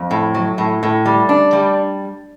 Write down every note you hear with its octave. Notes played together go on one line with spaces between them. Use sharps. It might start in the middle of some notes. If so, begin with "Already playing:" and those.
Already playing: F2
A2
F#3
A2
A2
G3
D4
G3